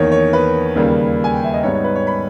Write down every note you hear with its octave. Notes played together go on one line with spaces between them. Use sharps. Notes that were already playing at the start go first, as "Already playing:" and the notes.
Already playing: E2 D#3 A#3 C#5
C#5
B4
D#2 C#3 G3 A#3
G#5
G5
E5
D#5
G#2 G3 B3 D#4 C#5
C#5
B4
C#5
B5